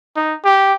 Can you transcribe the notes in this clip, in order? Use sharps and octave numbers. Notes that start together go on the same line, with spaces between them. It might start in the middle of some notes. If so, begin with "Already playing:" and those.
D#4
G4